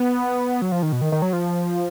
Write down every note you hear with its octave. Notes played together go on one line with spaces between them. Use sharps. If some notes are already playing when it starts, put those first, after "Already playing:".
Already playing: B3
F#3
F3
D#3
B2
D#3
D#3
F#3
F3